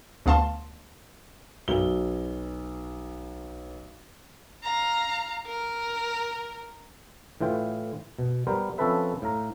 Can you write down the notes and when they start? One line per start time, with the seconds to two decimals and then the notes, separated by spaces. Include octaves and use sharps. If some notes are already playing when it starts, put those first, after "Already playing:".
0.26 D2 B3 F5 A5 C6
1.68 B1 G7
4.64 F5 A#5
5.47 A#4
7.41 A2 E3 F4 G5
8.19 B2
8.47 G3 B3 A#4 C5
8.78 F3 C4 C#4 A4 B4 E5
9.22 A2 F5 A#5